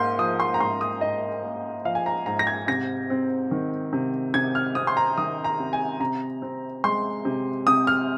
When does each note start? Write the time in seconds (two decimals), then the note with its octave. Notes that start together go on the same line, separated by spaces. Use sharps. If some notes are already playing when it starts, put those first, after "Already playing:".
Already playing: G#2 A#3 C6
0.19 F3 D#6
0.40 C6
0.54 A#5
0.60 G#2 C6
0.81 D#6
1.01 G#2 D#5
1.43 A#3
1.85 F3 F5
1.95 G#5
2.06 A#5
2.26 G#2 A#5
2.39 A#6
2.47 G#6
2.67 C3 A#6
3.10 C4
3.51 D#3
3.93 C3
4.34 C3 G#6
4.55 F6
4.75 C4 D#6
4.87 C6
4.97 A#5
5.18 D#3 D#6
5.44 A#5
5.59 C3
5.73 G#5
6.00 C3 A#5
6.42 C4
6.84 G#3 C6
7.25 C3
7.67 C3 D#6
7.87 F6